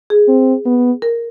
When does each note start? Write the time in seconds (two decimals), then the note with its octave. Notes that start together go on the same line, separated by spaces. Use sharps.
0.10 G#4
0.28 C4
0.66 B3
1.02 A#4